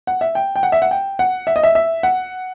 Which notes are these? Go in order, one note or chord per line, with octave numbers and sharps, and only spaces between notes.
F#5
E5
G5
G5
F#5
E5
F#5
G5
F#5
E5
D#5
E5
E5
F#5